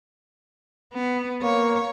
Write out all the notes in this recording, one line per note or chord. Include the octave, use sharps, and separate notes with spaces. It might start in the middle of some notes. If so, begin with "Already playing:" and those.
B3
A#3 C#5